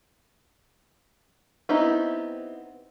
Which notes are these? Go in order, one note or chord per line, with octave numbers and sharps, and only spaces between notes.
B3 C4 D#4 E4 G4